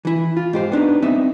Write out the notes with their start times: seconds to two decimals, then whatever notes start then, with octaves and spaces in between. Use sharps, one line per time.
0.05 E3 E4
0.37 F4
0.53 G#2 G4 C5
0.72 B3 D4 D#4
1.02 B3 C4 D#4 D#5 E5